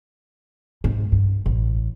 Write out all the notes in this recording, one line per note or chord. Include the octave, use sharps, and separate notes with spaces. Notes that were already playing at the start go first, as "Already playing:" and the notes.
G#2
G2
A1